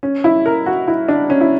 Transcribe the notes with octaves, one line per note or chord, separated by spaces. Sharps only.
C#4
E4
A#4
F#4
E4
D4
C#4
E4